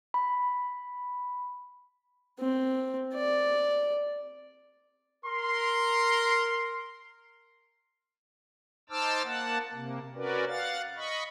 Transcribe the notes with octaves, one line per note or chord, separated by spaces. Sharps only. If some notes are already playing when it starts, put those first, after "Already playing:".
B5
C4
D5
A#4 C6
D#4 C5 A5 D6 E6 F6
A#3 F#5 A5
C3 A#3
C#4 F#4 A#4 B4 D5
F5 F#5 A6
D#5 B5 C#6